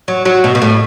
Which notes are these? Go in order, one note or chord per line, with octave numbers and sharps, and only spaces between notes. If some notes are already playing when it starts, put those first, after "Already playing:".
F#3
F#3
B2
B2
A2